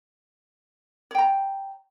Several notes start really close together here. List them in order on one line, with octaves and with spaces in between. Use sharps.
C#5 G5 A#5